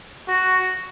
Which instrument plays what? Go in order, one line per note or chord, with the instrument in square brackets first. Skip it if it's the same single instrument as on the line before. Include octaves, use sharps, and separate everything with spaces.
[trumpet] F#4